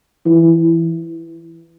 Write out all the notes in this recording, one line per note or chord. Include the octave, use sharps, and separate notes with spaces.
E3